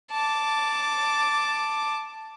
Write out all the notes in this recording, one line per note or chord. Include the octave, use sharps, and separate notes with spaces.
A5 D6